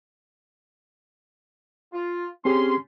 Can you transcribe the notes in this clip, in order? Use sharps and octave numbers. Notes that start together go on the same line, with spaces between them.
F4
C4 C#4 G4 G#4 C6